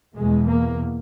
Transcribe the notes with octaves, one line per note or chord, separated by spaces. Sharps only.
E2 B2 G#3
A#3